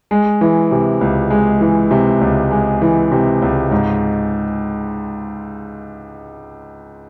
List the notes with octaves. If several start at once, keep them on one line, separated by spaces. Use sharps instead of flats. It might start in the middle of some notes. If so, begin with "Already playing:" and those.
G#3
E3
C3
C#2
G#3
E3
C3
C#2
G#3
E3
C3
C#2
G#2